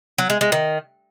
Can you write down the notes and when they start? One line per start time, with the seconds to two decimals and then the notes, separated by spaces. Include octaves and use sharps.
0.18 F#3
0.30 G#3
0.41 G#3
0.52 D#3